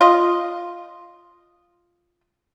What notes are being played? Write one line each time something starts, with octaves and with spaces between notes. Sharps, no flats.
F4 D#5